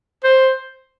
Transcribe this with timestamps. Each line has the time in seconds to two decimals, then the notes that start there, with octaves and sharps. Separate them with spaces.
0.24 C5